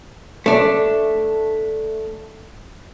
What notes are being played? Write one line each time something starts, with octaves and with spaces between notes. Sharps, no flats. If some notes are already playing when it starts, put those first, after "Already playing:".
A3 D4